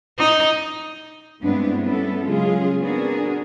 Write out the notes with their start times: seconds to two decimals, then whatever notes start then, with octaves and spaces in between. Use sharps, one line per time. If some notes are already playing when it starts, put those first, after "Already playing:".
0.18 D#4
1.41 G2 G#3 B3 C4 D4 E4
1.82 G3 B3 C#4 E4 A4
2.25 C#3 F#3 G#3 C#4 F4 G#4
2.80 B3 C4 D4 F#4 G#4 A#4